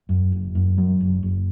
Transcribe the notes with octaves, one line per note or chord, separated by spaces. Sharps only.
F#2
F#1
F#2
F#3
F#1
F#1